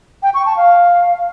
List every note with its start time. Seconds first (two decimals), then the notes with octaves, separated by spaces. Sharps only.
0.23 G5
0.34 C#6
0.46 A5
0.57 F5